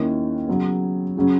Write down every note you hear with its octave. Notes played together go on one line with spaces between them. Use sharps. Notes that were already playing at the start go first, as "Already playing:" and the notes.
Already playing: D#2 D#3 A#3 C#4 E4
C#3 F#3 B3
C#3 F#3 C#4